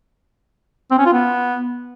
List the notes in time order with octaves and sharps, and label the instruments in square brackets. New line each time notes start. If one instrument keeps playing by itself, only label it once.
[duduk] C4
C#4
F4
B3